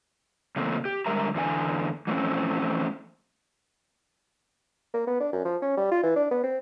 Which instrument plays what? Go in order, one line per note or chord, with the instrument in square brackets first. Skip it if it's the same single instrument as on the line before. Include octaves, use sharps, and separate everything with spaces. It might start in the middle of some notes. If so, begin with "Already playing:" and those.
[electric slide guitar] C#3 E3 A3 A#3 C4
G4
D3 G3 G#3 A#4 E5 A#5
E2 D3 D#4 G#5
E3 F3 A3 C4 C#4
[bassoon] A#3
B3
D4
F#2
F3
C#4
G3
F4
E3
D4
B3
C4